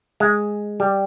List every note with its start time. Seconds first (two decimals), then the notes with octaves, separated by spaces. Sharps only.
0.20 G#3
0.80 G3